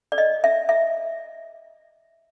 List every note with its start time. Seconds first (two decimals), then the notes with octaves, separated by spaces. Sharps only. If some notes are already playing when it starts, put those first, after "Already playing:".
0.12 D5
0.18 D#5
0.44 E5
0.69 E5